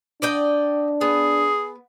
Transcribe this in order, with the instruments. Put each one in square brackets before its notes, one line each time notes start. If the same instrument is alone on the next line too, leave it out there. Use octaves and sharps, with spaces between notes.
[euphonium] D4 [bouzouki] D5 D#5 G5
[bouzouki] B3 [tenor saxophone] G#4